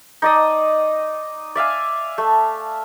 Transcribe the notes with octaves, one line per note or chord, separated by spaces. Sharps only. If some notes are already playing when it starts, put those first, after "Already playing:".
D#4 D5 D#5
D5 E5 F5 G#5
A3